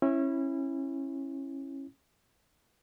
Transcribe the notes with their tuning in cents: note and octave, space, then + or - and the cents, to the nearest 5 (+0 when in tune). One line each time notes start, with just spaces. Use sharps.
C#4 -25 E4 +0